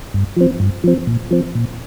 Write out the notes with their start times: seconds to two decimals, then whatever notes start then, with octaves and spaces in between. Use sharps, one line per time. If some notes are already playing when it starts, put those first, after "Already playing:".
0.14 G2
0.37 F3 C4
0.60 G2
0.84 F3 C4
1.07 A#2
1.31 F3 C4
1.55 A#2